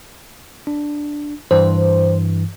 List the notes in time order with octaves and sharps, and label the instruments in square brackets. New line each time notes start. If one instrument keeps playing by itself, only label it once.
[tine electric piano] D4
[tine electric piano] G2 E3 [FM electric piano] C5